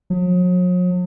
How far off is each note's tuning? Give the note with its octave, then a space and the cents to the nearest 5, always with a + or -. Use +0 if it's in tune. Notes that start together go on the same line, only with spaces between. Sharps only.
F#3 -45